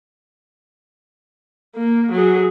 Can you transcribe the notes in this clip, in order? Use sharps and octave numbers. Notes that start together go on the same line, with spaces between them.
A#3
F#3 G#4